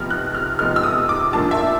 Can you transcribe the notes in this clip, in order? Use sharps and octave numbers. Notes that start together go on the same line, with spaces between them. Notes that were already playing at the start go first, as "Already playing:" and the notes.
Already playing: C3 F3 G#3 B3 F6
F#6
F6
C3 F3 G#3 B3 F6
E6
D#6
D6
A#2 F3 A#3 D4 A5
E5